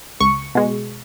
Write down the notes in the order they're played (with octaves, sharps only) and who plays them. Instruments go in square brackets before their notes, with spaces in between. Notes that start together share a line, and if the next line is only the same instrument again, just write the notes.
[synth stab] C#2 C#6
B2 G#3